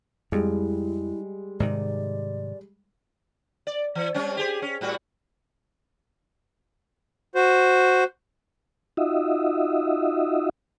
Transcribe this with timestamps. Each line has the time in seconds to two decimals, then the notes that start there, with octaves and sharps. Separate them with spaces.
0.32 F2 G3 G#3 E4
1.60 G#2 C3 D#3 D5
3.67 D5
3.95 E3
4.14 G3 C4 C#4
4.37 G4 G#4 C5
4.62 C#4
4.81 A2 G3 F#4
7.35 F#4 C5
8.97 D#4 F4 F#4 D#5 E5